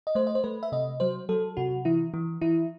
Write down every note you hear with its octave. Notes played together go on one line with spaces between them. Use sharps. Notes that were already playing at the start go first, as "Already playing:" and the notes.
D#5
A3 C5
D#5
C5
A3 B4
E5
C3 D#5
F#3 C5
F#3 A4
C3 F#4
E3 E4
E3
E3 E4